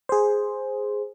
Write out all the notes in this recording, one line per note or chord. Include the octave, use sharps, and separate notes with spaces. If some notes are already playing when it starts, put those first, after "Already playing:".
G#4 C5